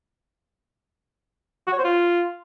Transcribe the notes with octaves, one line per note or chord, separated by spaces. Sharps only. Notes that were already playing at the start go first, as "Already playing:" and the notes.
F#4
C#5
C5
F4